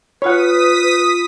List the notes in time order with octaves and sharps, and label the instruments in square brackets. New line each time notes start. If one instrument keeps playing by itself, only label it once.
[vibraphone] F4 B5 [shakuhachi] B4 [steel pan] C#5 F#5 [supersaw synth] D#6 B6